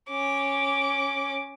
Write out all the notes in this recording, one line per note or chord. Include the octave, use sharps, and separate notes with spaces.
C#4 D6